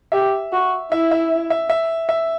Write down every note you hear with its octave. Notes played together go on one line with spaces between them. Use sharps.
G4 E5
F#4
E4 E5
E5
E5
E5
E5